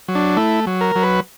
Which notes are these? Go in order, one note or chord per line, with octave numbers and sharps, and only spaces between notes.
F#3
D4
A3 E4
F#3
A#4
F#3
B4